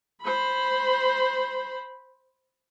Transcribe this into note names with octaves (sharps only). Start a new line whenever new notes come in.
C5 B5